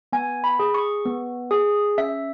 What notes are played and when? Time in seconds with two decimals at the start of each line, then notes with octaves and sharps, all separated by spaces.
0.12 B3 G#5
0.44 B5
0.59 G#4
0.74 C#6
1.05 B3
1.51 G#4
1.98 C#4 E5